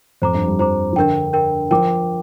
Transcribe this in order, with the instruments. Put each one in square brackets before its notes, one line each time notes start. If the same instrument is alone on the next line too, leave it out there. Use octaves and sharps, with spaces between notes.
[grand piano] F2 [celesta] C5 A#5 D6
[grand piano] G2
G3
[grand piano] F3 [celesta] C5 A#5 D6
[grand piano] F3
[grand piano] D3 [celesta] D4 A#4 G5
[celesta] D4 A#4 G5
[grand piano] F3 [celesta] A#4 G5 D6